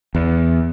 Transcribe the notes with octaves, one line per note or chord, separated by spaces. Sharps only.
E2